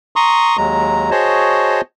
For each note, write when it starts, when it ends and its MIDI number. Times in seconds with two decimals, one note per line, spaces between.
0.16 0.57 82
0.16 0.57 84
0.16 0.57 85
0.16 0.57 87
0.57 1.10 39
0.57 1.10 54
0.57 1.10 56
0.57 1.10 82
1.11 1.81 66
1.11 1.81 68
1.11 1.81 72
1.11 1.81 73
1.11 1.81 75
1.11 1.81 81